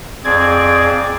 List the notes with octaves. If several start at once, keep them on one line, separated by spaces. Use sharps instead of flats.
F2 C4 G#4 D5 D6 G#6